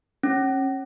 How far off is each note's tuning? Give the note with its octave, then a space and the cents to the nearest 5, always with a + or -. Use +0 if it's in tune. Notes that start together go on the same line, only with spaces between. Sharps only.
C#4 -30